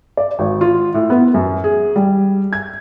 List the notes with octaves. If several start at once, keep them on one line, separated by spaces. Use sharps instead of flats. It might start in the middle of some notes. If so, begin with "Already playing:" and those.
D5
G#1
F4
A2
B3
F#2
G#4
G3
G#6